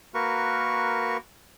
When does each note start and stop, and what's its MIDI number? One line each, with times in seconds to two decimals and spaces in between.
0.14 1.17 58
0.14 1.17 66
0.14 1.17 70
0.14 1.17 71
0.14 1.17 85